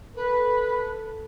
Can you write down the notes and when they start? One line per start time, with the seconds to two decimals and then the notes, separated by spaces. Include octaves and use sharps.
0.16 A4 B4